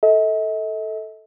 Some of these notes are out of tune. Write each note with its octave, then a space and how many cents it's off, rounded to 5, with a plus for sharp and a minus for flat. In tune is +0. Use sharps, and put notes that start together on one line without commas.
A4 +0 D#5 +45